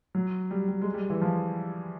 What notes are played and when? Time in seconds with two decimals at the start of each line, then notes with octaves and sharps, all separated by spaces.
0.15 F#3
0.51 G3
0.68 G3
0.82 G#3
0.94 G3
1.10 E3
1.22 F3